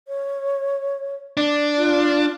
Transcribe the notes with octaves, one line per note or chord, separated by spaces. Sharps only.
C#5
D4
F4